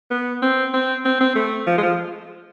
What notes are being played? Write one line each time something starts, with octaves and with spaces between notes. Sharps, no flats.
B3
C4
C4
C4
C4
A3
F3
G#3
F3